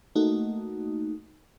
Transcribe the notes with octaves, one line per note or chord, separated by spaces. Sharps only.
A3 A#3 D#4 F#4